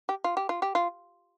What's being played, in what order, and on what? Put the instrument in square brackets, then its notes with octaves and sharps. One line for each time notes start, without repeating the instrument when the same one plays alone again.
[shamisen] G4
F4
G4
F4
G4
F4